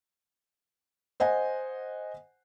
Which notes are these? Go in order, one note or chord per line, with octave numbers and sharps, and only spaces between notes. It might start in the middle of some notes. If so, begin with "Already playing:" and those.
C5 D#5 F#5 G#5